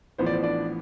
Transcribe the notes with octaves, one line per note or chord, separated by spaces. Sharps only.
A1 A2 F3 B3 C5
D5
C5
D4 D5